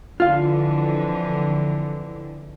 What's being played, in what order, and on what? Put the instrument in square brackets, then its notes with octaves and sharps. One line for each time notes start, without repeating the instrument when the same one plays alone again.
[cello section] F2 D3 E3 [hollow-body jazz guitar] F4 F5